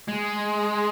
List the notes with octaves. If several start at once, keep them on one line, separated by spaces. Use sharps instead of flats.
G#3